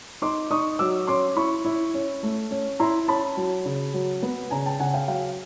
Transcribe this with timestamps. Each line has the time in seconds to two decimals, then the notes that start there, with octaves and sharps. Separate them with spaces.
0.22 D#4 C6 D6
0.50 D#4 C#6 D#6
0.79 F#3 D6 E6
1.07 C#4 C6 D6
1.36 E4 B5 C#6
1.65 E4
1.94 C#4
2.23 A3
2.51 C#4
2.80 E4 A#5 C6
3.08 C#4 A5 B5
3.37 F#3
3.65 C#3
3.94 F#3
4.23 B3
4.50 C#3 G#5 A#5
4.66 G5 A5
4.79 C#3 F#5 G#5
4.94 F5 G5
5.08 F#3 F5 G5